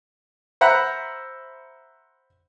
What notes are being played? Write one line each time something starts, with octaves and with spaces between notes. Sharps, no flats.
C5 E5 F#5 A#5 B5